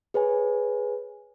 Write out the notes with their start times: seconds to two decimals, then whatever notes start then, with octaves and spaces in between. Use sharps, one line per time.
0.14 G#4 B4 C#5 G#5